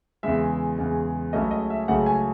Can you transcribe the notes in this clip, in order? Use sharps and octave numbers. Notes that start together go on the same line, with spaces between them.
E2 C#3 G#3 E5
E2 C#3 G#3
C#2 C#3 F#3 A3 C#4 D#5
D#5
E5
C#2 C#3 F#3 A3 C#4 F#5
G#5